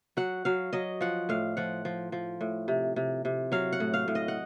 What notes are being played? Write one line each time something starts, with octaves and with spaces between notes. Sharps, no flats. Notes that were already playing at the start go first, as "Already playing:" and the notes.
F#3 F#5
F#3 F5
F#3 D#5
F3 F#5
A2 F5
F3 F#5
F3
F3
A2
C3
C3
C3
F#3 F5
F#5
A2
F5
A2
D#5
F#5